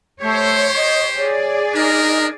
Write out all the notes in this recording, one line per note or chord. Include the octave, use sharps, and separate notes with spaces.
A3 G4 C5 C#5
D#5
G#4 C#5 D5
D4 D#4 A#4